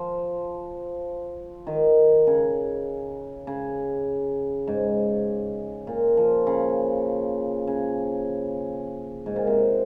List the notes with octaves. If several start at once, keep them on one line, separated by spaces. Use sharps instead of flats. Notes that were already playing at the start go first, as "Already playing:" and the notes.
Already playing: F3
D#3
C#3
C#3
G#2
A#2
F3
C#3
C#3
G#2
A#2
C3